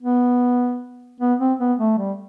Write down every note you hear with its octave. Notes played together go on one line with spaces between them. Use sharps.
B3
B3
C4
B3
A3
G3